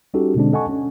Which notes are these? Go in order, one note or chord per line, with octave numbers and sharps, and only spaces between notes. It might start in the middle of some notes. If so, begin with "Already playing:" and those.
G3 C#4 D#4 F#4 G4 A4
B2 D3 G#3 C4 D4
A4 D#5 F#5 G#5 A5 C#6
C#4